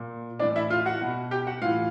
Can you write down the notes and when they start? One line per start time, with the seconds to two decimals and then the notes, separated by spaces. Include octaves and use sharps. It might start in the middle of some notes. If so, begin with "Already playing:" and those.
Already playing: A#2
0.40 A2 E3 D4 D5
0.56 E4 E5
0.70 F4 F5
0.85 F#4 F#5
1.01 B2
1.31 G4 G5
1.47 F#4 F#5
1.62 A2 E3 F4 F5